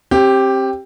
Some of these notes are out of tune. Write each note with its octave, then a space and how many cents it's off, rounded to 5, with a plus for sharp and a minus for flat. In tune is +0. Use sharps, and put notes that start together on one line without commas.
C4 +30 G4 +0